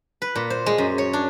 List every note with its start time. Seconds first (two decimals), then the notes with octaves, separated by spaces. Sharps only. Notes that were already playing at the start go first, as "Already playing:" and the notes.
0.22 B4
0.36 A#2
0.50 C5
0.66 G#3
0.78 F#2
0.98 C#5
1.13 D4